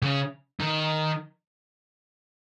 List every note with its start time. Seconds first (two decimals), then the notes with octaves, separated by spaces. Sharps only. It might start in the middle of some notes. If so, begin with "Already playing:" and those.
0.03 C#3
0.60 D#3